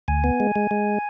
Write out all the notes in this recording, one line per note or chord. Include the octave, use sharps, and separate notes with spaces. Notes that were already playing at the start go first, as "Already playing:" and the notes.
D2 G#5
B3
G#3
G#3
G#3